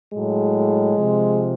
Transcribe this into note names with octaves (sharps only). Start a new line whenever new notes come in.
A2 F#3 G#3
C3 F3